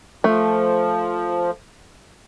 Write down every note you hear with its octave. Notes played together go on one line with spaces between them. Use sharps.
F3 A3